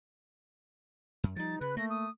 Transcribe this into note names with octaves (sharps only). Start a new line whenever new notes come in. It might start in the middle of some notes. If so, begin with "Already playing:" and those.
F#2
F3 G3 D#4 A6
C#3 B4 F#6
A3 A#3 A#6
D#6